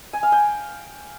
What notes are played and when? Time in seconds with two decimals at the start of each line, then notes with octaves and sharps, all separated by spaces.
0.13 G#5
0.23 F5
0.32 G5